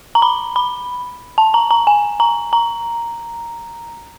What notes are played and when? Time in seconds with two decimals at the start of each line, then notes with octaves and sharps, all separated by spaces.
0.15 A#5
0.22 B5
0.56 B5
1.38 A5
1.54 A#5
1.71 A#5
1.87 G#5
2.20 A#5
2.53 A#5